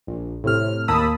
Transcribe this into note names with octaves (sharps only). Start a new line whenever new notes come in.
A#1
A2 C3 F6
D#2 A#3 A5 B5 D#6 E6